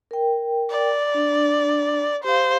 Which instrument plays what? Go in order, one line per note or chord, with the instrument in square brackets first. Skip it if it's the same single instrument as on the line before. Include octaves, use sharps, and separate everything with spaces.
[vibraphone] A#4 G5
[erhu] D5
[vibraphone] D4
[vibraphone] G4 F5 [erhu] C5